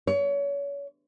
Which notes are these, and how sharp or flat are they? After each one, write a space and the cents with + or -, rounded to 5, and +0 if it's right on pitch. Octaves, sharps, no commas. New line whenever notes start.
C#5 +30